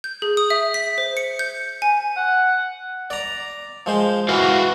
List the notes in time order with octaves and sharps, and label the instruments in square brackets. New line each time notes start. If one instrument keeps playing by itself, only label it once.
[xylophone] G6
G#4
D#6
E5
B6
C5
C#7
G6
G#5
[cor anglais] F#5
[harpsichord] D5 A#5
F3 G#3 C5
[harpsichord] E3 [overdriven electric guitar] F#4 F5